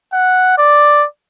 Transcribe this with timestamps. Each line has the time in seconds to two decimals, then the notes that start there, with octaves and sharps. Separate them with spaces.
0.13 F#5
0.58 D5